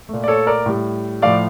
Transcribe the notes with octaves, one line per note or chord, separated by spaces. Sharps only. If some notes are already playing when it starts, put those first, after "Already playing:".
A#2 A3
D5
A4 C#5
A#4 D5
A2 G3
A2 F3 A3 D5 F5